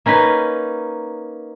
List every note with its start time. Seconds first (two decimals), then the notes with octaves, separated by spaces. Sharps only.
0.06 A#3 C#4 D#4 B4